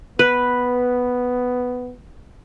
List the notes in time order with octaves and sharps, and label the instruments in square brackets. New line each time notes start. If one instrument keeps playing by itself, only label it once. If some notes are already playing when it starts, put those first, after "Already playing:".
[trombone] B3 [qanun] B4